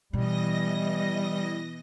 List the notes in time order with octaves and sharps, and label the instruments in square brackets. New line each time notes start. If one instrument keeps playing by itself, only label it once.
[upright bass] B2 [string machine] E3 D#5 A#6 [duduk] G3